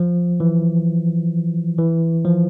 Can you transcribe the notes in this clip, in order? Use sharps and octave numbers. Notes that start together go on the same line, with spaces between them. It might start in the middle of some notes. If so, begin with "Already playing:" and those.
Already playing: F3
E3
E3
F3